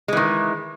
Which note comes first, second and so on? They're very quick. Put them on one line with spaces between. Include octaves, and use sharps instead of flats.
G#3 E3 D#3